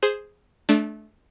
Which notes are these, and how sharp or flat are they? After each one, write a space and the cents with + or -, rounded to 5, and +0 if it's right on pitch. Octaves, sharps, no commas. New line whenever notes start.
G#4 +0 C5 +0
A3 -25 D4 +0